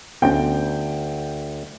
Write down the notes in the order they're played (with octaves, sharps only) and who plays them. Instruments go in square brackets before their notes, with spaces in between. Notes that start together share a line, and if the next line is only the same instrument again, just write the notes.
[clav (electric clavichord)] D2 [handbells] B3 C#4 [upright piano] G5